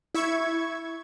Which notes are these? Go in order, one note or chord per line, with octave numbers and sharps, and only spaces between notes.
E4 E5 C#6 G#6